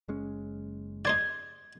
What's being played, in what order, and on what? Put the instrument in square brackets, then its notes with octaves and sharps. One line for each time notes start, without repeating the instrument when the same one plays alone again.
[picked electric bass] F#1 G#3 C#4
[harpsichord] D#4 C5 D5 [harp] G#6